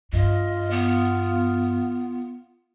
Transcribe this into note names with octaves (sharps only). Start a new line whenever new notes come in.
G2 F4 D#5
B3